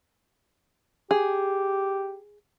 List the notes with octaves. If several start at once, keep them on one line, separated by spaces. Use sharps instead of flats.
G4 G#4